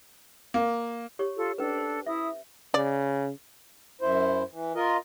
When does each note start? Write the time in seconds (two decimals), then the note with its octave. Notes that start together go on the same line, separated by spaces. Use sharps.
0.54 A#3
1.19 G4 C#5
1.36 F4 A4
1.58 C#4 D4 A4 B4
1.78 C5
2.06 E4 E5 D#6
2.74 C#3 D5
4.01 F#2 E4 C5
4.52 E3
4.75 F4 A#4 D#5